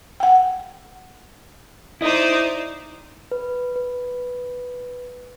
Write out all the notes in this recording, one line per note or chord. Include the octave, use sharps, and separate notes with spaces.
F#5 G5
D#4 E4 C5 D5 D#5
B4
B4